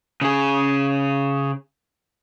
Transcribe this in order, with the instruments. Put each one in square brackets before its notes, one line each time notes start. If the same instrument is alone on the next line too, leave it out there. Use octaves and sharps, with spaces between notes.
[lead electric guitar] C#3 G#4